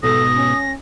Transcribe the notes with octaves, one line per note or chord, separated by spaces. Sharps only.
G#2 B2 A4 D#6 A#6
C#4